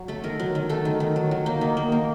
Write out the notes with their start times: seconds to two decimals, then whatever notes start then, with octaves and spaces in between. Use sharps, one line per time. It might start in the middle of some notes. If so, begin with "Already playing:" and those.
Already playing: F#3
0.08 A3 A4
0.24 D#3 A#4
0.40 F#3
0.55 D#3
0.69 A3 A4
0.85 D#3
1.00 D#3
1.16 F#3
1.31 F#3
1.46 A#3
1.61 D#3 D#4
1.77 A#3
1.92 A#3